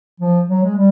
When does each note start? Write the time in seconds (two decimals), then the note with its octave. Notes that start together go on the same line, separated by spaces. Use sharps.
0.20 F3
0.48 F#3
0.64 G#3
0.76 G3